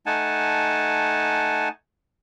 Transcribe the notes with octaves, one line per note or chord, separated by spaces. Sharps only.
A3 D#4 F#5 G#5 A5